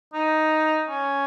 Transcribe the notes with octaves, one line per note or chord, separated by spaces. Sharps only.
D#4
C#4